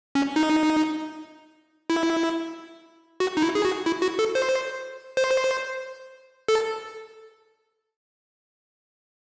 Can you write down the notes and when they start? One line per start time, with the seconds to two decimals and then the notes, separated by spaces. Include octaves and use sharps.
0.15 C#4
0.36 D#4
1.90 E4
3.20 F#4
3.37 D#4
3.42 E4
3.55 G#4
3.65 F#4
3.86 E4
4.02 F#4
4.19 A4
4.35 C5
5.17 C5
6.48 A4